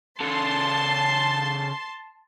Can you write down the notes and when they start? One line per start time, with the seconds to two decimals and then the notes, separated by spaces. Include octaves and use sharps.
0.20 C#3 A4 A5 C6